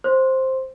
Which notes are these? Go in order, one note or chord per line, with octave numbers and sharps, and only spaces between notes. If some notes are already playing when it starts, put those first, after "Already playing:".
C5